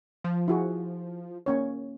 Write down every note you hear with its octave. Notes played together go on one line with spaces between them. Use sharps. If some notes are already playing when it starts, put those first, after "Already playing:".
F3
E4 F#4 G#4
A#3 C#4 C#5